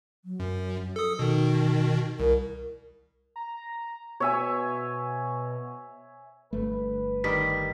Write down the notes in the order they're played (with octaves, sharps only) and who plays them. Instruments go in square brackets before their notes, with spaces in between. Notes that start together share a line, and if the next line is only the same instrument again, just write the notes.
[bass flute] F#3
[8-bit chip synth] F#2
A4 D#6
[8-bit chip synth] B2 D#3 [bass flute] D#4
[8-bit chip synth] C2 [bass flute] A#4
[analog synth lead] A#5
[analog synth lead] B2 [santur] C#5 E5 G#5
[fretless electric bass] G1 A3 [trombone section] B4
[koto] D#3 G3 [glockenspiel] B6